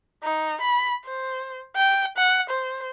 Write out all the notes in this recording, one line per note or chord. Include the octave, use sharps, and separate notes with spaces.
D#4
B5
C5
G5
F#5
C5